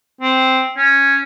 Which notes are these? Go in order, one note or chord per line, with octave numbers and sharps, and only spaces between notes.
C4
C#4